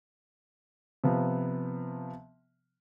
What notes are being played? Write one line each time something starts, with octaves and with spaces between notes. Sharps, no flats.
C3 F3 B3